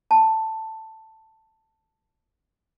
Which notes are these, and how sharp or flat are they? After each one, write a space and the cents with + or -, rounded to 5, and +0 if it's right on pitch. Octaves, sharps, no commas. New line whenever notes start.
A5 +10